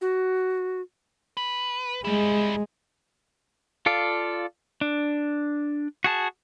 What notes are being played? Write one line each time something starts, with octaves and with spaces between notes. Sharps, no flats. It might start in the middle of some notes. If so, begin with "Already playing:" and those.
F#4
B4
G3 G#3 E4
F4 A4 D5 F5
D4
F#4 G#4 A5